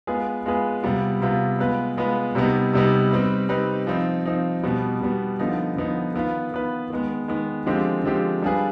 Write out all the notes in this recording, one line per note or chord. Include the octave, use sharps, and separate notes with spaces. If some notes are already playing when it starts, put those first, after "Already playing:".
G#3 B3 F4 G#4 B4
G#3 B3 F4 G#4 B4
C3 G3 B3 F4
C3 G3 B3 F4
G#3 B3 F4 B4
G#3 B3 F4 B4
C3 G3 B3 D#4
C3 G3 B3 D#4
G3 C4 D#4 B4
G3 C4 D#4 B4
F3 C4 D#4
F3 C4 D#4
B2 G3 B3
B2 G3 B3
D3 F3 B3 D#4
D3 F3 B3 D#4
D#3 B3 F4 B4
D#3 B3 F4 B4
D#3 G#3 B3
D#3 G#3 B3
D3 F3 G#3 C4 G4
D3 F3 G#3 C4 G4
G3 D4 F4 G#4 B4